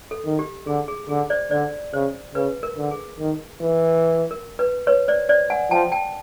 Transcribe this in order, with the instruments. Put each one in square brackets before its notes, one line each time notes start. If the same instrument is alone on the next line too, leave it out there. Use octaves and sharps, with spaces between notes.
[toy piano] A4
[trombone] D#3
[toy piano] G4
[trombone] D3 [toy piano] G#4
[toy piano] G#4
[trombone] D3 [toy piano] G#4
[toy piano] C5 D5
[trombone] D3 [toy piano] C5 D5
[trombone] C#3 [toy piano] C5
[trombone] C#3 [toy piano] B4
[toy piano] A#4
[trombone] D3
[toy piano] G#4
[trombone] D#3
E3
[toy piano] A#4
B4
B4 C#5
C5 D5
C5 D5
F#5 G#5
[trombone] F3 [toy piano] G5 A5
[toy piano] G5 A5